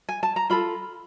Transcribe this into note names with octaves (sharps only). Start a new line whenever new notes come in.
G#5
A5
A#5
F4 A4 B5